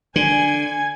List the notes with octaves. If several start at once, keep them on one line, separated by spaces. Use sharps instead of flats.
D3 G#5 G#6